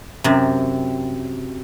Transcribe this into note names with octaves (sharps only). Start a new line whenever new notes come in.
F#2 C3